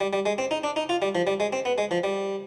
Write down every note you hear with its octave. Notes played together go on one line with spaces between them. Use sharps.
G3
G3
G#3
C4
D#4
D4
D#4
F4
G3
F3
G3
G#3
C4
B3
G#3
F3
G3